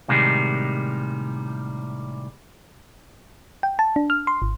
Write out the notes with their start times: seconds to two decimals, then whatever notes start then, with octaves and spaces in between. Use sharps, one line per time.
0.08 A2 C3 D#3 G3 G#3
3.63 G5
3.79 A5
3.96 D4
4.10 F6
4.27 C6
4.42 G#1